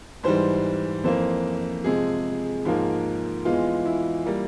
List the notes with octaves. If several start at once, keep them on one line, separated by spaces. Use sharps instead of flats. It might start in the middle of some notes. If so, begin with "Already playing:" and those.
G#2 E3 G3 C5
F2 E3 A#3 C5
C3 F3 G#3 G#4
G#2 F3 A#3
E2 E3 G#3 F4
E4
G3 A#3